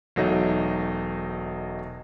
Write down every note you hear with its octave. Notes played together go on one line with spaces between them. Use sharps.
E1 F#3 A3 D#4